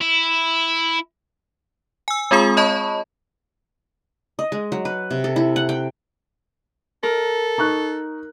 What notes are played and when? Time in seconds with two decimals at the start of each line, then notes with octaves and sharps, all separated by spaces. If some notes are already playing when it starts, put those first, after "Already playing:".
0.01 E4
2.08 G#5 E6
2.31 G#3 C4 F4 G#4 B5 D#6
2.57 C#5 D#5 A5 B5 C#6
4.39 D#5
4.52 G#3
4.72 F#3
4.85 B4
5.11 C3
5.24 A4
5.36 E4
5.56 F#5
5.69 G5
7.03 A4 A#4
7.58 D#4 C#6 F#6